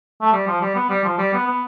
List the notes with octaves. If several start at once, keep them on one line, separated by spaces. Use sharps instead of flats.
A3
G3
F3
G3
B3
G3
F3
G3
B3
B3